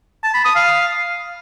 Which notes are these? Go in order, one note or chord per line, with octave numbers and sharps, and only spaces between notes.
A5
B5
D#6
F5